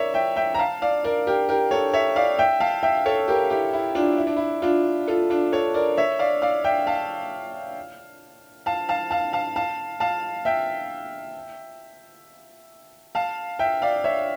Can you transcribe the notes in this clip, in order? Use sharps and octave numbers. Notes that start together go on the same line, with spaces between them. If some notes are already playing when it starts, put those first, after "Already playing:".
Already playing: A#4 C#5 D5 E5
E5 G5
E5 G5
A#5
F5 A5
D5 F5
A#4 D5
G4 A#4
G4 A#4
A4 C#5
C#5 E5
D5 F5
E5 G5
F5 A5
E5 G5
A4 C#5
G4 A#4
E4 G4
E4
D4 F4
E4
D4
E4
D4 F4
F4 A4
D4 F4
A4 C#5
A#4 D5
C#5 E5
D5 F5
D5 F5
E5 G5
F5 A5
F5 A5
F5 A5
F5 A5
F5 A5
F5 A5
F5 A5
E5 G5
F5 A5
E5 G5
D5 F5
C#5 E5